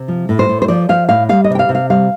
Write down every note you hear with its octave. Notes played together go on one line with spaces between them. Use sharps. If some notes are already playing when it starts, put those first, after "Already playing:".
Already playing: C3
F3
A2
C5
A2
C5
F3 D5
F3 F5
A2 F5
G3 F5
D#5
C3
G5
F5
C3
F5
G3 F5